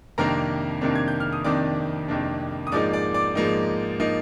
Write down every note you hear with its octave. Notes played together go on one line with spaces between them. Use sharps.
F2 C3 D#3 A#3 D4 A#4 A#5
F2 C3 D#3 A#3 D4
G#6
G6
F6
D#6
F2 C3 D#3 A#3 D4 D5 D6
F2 C3 D#3 A#3 D4
D#6
G#2 F3 A#3 D#4 D5 D6
D5 D6
D5 D6
G#2 F3 A#3 D#4
F3 A#3 D#4